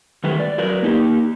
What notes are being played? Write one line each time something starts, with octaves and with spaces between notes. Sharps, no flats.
D#3 G3 A3 G4 B4
D5
F#3 A#4 B4 D5
A#3 D#4 G4